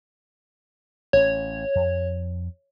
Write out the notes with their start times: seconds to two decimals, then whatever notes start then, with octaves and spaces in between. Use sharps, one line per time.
1.13 A1 C#4 C#5
1.75 F2